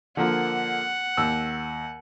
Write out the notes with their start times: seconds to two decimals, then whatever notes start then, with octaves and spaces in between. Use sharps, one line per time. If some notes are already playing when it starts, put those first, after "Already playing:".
0.17 D3 F3 A#3 F#5
1.17 D#2 E6